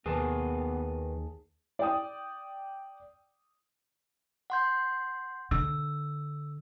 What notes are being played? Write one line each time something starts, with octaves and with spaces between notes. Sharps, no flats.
D#2 D#3 B3 G#4 A#4 B4 A5
D5 G5 D#6
F#5 C6 G6
D3 E6